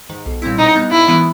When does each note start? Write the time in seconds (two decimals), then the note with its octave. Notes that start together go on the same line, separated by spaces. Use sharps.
0.09 G#2 D#3
0.26 B1
0.42 A#2 G3 C4 E4
0.59 B2 D#4
0.75 G3 B3 D#4
0.91 G#2 E4
1.08 E3 G#3 B3